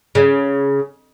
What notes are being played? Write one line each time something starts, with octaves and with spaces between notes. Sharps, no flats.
C#3